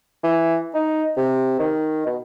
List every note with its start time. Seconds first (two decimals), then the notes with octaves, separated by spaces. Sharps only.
0.24 E3
0.74 D#4
1.17 C3
1.59 D#3
2.06 B2